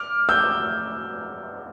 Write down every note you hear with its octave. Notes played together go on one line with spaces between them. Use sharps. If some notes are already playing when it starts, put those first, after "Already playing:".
Already playing: D6 F6
E6 G6